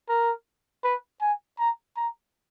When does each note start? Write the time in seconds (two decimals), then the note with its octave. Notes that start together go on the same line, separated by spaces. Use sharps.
0.09 A#4
0.84 B4
1.21 G#5
1.59 A#5
1.96 A#5